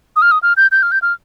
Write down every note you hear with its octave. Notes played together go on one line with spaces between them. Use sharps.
D#6
F6
D#6
F6
G6
G6
F6
G6
F6